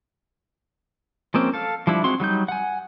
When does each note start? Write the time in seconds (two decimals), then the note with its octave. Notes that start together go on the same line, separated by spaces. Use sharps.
1.34 F3 G#3 A#3 C4 C#4
1.54 A4 F5
1.87 F3 G3 D4 E4
2.04 G#3 C4 F#4 C6
2.20 F#3 G3 D#4 G6
2.48 F#5 G#5